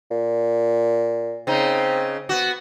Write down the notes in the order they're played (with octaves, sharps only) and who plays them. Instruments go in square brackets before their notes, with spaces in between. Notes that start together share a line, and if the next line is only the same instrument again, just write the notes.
[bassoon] A#2
[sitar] C#3 D#4 [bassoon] C4
[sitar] B3 F#4